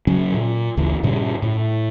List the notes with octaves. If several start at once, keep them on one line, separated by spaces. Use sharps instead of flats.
C#3 F#3 C#4
A#2
G1 D2 C#3 E3
G2 A#2 C#3 G3
A2